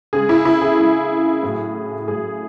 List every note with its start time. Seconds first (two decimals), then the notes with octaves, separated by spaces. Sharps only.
0.13 C#3 G#3 G#4
0.29 E4
0.45 E4
0.61 G#4
0.78 C#3 G#3
1.43 A2 F#3
2.07 A2 F#3 G#4